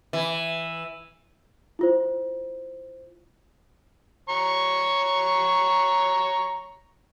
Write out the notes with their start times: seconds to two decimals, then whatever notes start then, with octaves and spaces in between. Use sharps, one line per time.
0.13 E3
1.79 E4 F4 C5
4.30 C#5 A#5 C#6